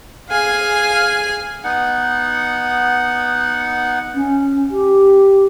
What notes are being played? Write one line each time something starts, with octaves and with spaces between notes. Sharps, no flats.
G#4 F5 G#5
B3 D#4 F#5
C#4
G4